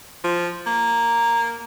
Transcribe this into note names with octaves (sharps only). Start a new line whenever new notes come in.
F3
A#3